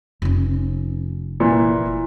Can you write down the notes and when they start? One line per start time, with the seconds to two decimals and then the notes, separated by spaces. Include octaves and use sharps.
0.22 F1 C#4
1.40 A#2 E3